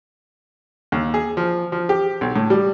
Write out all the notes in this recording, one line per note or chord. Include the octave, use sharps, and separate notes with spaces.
D#2
G#4
F3
F3
G4
B1
A2
G3